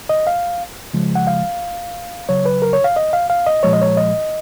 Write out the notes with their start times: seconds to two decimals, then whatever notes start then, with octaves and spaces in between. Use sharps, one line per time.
0.09 D#5
0.27 F5
0.94 C#3 F3 G#3
1.15 F#5
1.27 F5
2.29 C#3 F#3 C#5
2.45 B4
2.62 A#4
2.73 C#5
2.84 F5
2.96 D#5
3.13 F5
3.30 F5
3.46 D#5
3.63 A#2 F3 G#3 C#5
3.73 D#5
3.81 C#5
3.97 D#5